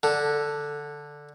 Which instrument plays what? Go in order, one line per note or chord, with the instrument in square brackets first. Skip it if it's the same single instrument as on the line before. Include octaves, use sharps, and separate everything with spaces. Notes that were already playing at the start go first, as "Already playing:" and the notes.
[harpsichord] D3